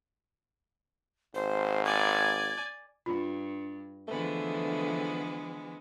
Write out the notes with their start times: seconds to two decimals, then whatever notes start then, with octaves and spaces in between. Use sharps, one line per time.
1.35 G#1 C5
1.85 D5 G#5 G#6
3.06 G2 F4
4.08 D3 E3 F3 G#3 A3 B3